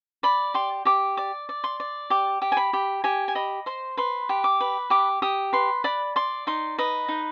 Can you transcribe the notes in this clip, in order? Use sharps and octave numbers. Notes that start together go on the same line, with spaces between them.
D5 B5
G4 C6
G4 D6
D5 D6
D5
C6
D5
G4 D6
G4
G#5
B5
G4
G4 G#5
G#5
D#5 B5
C5 C6
B4 C6
G4
D6
B4
G4 D6
G4 D#6
B4 C6
D5 B5
D5 C6
D#4 C6
B4 D#5
D#4